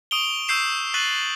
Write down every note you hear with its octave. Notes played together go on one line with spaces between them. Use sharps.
C#6 D#6 D7 F7 G7
C#6 E6 G6 C7 E7
C#6 F#6 A6 B6 D#7 F#7